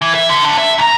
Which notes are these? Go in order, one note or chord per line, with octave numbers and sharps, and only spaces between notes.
E3
E5
D3
G#2 D4
E5
B1 A#5